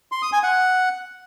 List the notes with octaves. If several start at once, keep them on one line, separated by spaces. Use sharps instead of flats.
C6
D#6
G#5
F#5